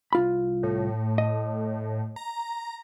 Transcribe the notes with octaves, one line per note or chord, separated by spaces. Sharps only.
C2 F4 B5
A2
D#5
A#5